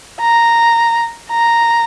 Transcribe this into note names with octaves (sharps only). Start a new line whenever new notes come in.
A#5
A#5